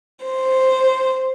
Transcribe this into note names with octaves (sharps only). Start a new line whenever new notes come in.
C5